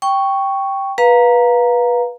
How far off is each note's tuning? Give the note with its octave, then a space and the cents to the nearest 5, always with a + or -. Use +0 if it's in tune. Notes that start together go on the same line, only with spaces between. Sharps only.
G5 +0 C#6 +0
B4 -20 F5 +15 A#5 +0